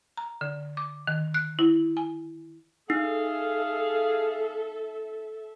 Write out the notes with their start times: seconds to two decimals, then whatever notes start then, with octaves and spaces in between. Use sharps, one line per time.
0.17 A#5
0.41 D3
0.77 D6
1.07 D#3
1.34 F#6
1.59 E4
1.97 G#5
2.90 D#4 G#4 A4 E5 F5